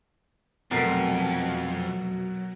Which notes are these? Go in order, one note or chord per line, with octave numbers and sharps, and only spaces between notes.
F1 F2 B2 F#3 A4 A#4 A6 C7